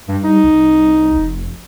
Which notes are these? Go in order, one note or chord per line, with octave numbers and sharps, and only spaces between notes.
G2 G3
D#4
C2
F1